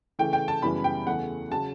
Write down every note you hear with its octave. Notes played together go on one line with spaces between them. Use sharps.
C#3 E3 A3 G5
G5
A5
F#2 C#3 E3 G3 B3 B5
G5
E2 C#3 E3 A3 F#5
C#3 F#3 A5